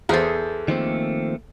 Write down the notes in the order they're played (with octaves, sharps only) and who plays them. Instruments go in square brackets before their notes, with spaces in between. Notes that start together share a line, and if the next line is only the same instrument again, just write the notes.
[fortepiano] E2 C5 [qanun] G#4 A4
[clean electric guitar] D#3 F3 C4 [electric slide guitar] A3 A#3